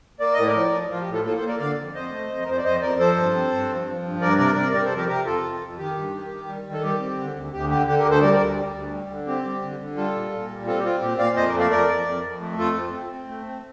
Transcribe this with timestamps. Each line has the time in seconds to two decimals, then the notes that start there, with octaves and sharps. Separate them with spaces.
0.20 A#3 D5
0.34 A2 D#5
0.48 A#4 D5
0.55 F3
0.72 F3
0.90 F3 F4
1.02 G4
1.08 A2
1.13 F4 A4
1.24 A#3 F4 A4
1.36 A4 C5
1.42 A#3
1.48 A#4 D5
1.59 D3 D5 F5
1.77 F2
1.94 F2 C5 D#5
2.12 A3
2.29 F2
2.43 A#4
2.47 F2 C5
2.57 D5
2.64 F2 C5 D#5
2.82 F2 A#4 D5
2.99 F3 A4 C5
3.17 G2
3.34 C4
3.51 G2
3.69 F3
3.87 F3
4.04 G2
4.21 G2 A#4 D5
4.38 C3 A#4 D5
4.56 C3 A#4 D5
4.73 G3 A#4 D5
4.85 A4 C5
4.91 F2
4.97 G4 A#4
5.08 C3 G4 A#4
5.26 F2 F4 A4
5.44 F2
5.61 F2
5.78 D#3 G4
5.96 G2
6.13 D#3
6.30 D#3
6.48 G3
6.65 D#3
6.73 A4
6.83 G3 G4
7.00 C4
7.18 D3
7.35 D2
7.53 D2 G4
7.70 D3 G4
7.87 D3 G4
7.99 G4 A#4
8.05 D2
8.11 A4 C5
8.22 G3 A#4 D5
8.34 A#4 D5
8.40 D2
8.57 G3
8.75 D2
8.92 G3
9.10 D3
9.27 C4 G4
9.44 G3
9.62 D3
9.79 D3
9.96 G3 F4 A4
10.14 A#2
10.32 A#2
10.49 G3
10.66 C4 F4 A4
10.79 G4
10.84 C4 F4
11.01 A#2 G4
11.19 A#2 D5 F5
11.36 F2 C5 D#5
11.48 A#4 D5
11.53 A3
11.59 D5 F5
11.71 F2 A#4 D5
11.89 F2
12.06 F2
12.23 F2
12.41 A3
12.58 F2 F4 A4
12.76 C4
12.93 C4
13.11 C4
13.28 A3
13.46 C4